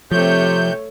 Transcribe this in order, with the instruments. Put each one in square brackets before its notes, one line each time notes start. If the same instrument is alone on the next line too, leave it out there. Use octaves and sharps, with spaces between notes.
[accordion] C3 G6 [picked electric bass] F3 [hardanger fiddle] A3 C#5